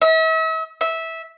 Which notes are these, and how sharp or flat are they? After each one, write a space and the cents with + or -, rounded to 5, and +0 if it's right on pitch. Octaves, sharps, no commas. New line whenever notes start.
E5 -40
E5 -15